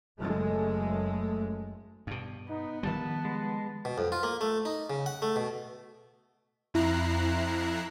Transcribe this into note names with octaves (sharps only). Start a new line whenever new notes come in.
F#1 F#2 G#3 A3
G2 B2
B3 D#4
D#3 F3 G3 A5
G#3
B2
F2
F4
A#3
A3
D#4
C#3
F#5
A3
B2
F2 E4 A#5 F#6 C7